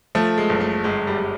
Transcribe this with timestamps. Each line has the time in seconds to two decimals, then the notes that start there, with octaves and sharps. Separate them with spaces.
0.15 F3 A3
0.38 G#3
0.49 F#1
0.61 A3
0.84 G1 G#3
1.07 G3
1.20 G3